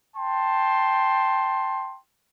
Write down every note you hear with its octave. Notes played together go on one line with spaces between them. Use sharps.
G5 A5 C6